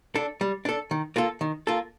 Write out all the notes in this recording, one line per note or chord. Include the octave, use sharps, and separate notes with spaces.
D4 A4
G3
D4 A4
D#3
A#3 F4 A4
D#3
A#3 F4 A4